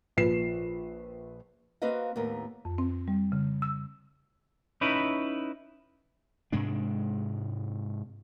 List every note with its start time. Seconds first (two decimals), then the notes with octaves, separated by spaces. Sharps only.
0.17 A#1 F3 B4 C7 E7
1.82 A#3 C4 F#4 B4 D#5 F5
2.16 D#2 A2 B3 A#4
2.65 F2
2.78 C4
3.08 G3
3.32 C#3
3.62 E6
4.81 C#4 D#4 E4 B4
6.52 G#2 C3 G#3 D4